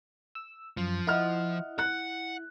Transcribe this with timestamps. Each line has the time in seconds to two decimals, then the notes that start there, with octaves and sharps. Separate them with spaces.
0.35 E6
0.77 F#2 F3
1.07 E4 D#5 F#5 F6
1.79 F#5 F#6